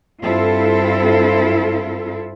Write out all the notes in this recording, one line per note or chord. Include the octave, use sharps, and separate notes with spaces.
G2 C4 E4 F4 A4